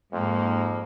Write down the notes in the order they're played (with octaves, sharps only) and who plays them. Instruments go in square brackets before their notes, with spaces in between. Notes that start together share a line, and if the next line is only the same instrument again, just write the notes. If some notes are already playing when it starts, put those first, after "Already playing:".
[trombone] F2 [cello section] G#2 A#3